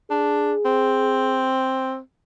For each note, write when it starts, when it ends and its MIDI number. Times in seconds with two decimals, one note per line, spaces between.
0.10 0.53 62
0.10 1.54 68
0.65 1.98 60